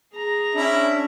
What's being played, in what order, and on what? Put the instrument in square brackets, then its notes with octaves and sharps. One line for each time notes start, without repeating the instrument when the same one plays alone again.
[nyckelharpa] G#4 A#5
[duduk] C#4 [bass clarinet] D4 [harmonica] E4